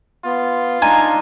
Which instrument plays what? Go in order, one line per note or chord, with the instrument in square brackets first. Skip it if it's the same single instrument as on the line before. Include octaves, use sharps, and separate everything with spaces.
[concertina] B3 [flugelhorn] F4
[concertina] D4 D#4 D#5 [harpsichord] G#5 [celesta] A#5